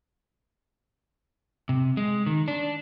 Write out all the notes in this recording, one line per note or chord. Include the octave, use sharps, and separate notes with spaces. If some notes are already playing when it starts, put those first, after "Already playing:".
C3
G#3
D#3
D4